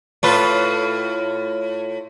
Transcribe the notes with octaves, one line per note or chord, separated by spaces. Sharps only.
A2 F4 B4